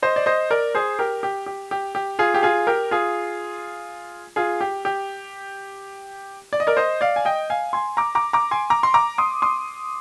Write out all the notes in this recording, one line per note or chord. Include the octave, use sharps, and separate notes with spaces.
C5 D#5
D5
C5 D#5
A#4 D5
G#4 C5
G4 A#4
G4
G4
G4
G4
F4 G#4
G4
F4 G#4
G4 A#4
F4 G#4
F4 G#4
G4
G4
D5
D#5
A#4 D5
C5 D#5
D5 F5
G#5
D#5 G5
F5 G#5
G#5 C6
A#5 D6
A#5 D6
A#5 D6
G#5 C6
A#5 D6
C6
A#5 D6
C6 D#6
C6 D#6